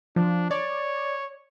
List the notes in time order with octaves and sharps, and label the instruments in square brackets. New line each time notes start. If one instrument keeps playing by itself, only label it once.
[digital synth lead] F3 [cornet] D4
[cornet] C#5 [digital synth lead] D5